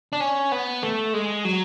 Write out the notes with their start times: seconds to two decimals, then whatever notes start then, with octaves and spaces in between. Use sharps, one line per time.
0.13 D4
0.20 C#4
0.52 B3
0.83 A3
1.13 G#3
1.45 F#3